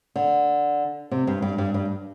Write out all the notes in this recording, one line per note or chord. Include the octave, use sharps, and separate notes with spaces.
D3
C3
G2
G2
G2
G2